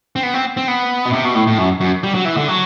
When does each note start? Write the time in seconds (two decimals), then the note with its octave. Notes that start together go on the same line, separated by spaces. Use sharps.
0.16 C4
0.23 B3
0.34 C4
0.57 C4
0.68 B3
1.06 B2
1.13 C3
1.25 B2
1.35 A2
1.47 A2
1.58 F#2
1.81 F#2
2.04 G3
2.14 F#3
2.25 E3
2.37 D3
2.48 F#3